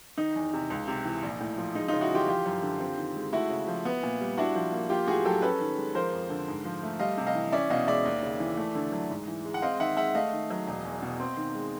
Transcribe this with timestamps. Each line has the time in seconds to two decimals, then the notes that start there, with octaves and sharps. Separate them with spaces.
0.18 D#3 D#4
0.36 E2
0.53 C3
0.70 C#2
0.88 C3
1.05 E3
1.23 A#1
1.40 A2
1.58 F3
1.75 G#3 D#4
1.88 C#3 D#4 F4
2.01 E4 F#4
2.10 E3 F4 G4
2.28 F3 F4 G4
2.46 F#2
2.62 D3
2.80 C4
2.98 D#3
3.15 G#3
3.33 A3 E4 F#4
3.50 C#3
3.68 F3
3.85 B3
4.03 A#2
4.21 G3
4.38 D4 E4 F#4
4.55 F3
4.72 A#3
4.90 A#3 F4 G4
5.07 A2 F#4 G#4
5.25 F#3 G4 A4
5.42 C#4 A4 B4
5.60 D#3
5.77 G#3
5.95 F3 A#4 C5
6.13 F2
6.30 D3
6.48 G#2
6.65 F3
6.83 A3
6.99 G3 D#5 F5
7.18 C3
7.26 D#5 F5
7.35 E3
7.52 C#4 D5 E5
7.70 B2 D#5 F5
7.87 G#3 D5 E5
8.05 D#2
8.23 C#3
8.40 E3
8.57 A3
8.75 D3
8.92 F#3
9.10 G#2
9.28 E3
9.45 G#3
9.54 F#5
9.62 C4 D#5 F5
9.80 D#3 E5 F#5
9.97 G#3 E5 F#5
10.14 A3 D#5 F5
10.33 D#3
10.50 F#3
10.67 E1
10.85 E2
11.02 B2
11.20 C4
11.37 D#3
11.55 G#3